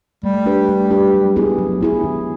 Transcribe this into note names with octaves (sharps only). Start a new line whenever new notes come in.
G3 A3
D4 G4 B4
A3
D4 G4 B4
F#3
B3 E4 G#4
F#3
B3 E4 G#4
D#3